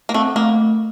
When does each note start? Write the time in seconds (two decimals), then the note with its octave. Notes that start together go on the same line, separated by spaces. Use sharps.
0.09 A#3
0.14 A3 C4
0.36 A3 A#3